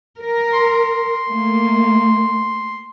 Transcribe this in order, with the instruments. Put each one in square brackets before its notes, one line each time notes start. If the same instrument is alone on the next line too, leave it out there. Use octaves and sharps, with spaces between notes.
[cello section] A#4
[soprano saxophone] C6
[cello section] A3 A#3